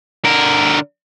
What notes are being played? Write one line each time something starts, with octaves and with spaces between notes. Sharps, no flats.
D3 A#4